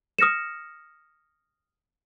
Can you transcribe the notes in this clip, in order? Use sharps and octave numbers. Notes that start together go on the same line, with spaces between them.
D#6 F6 A#6 C#7 E7